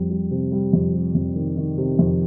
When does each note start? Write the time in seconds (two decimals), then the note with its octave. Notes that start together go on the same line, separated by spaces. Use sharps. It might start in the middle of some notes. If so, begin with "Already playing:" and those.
Already playing: F2 G3
0.10 G3
0.31 C3
0.52 G3
0.73 F2
0.93 C3
1.15 F2
1.36 D#3
1.57 D#3
1.78 C3
1.99 F2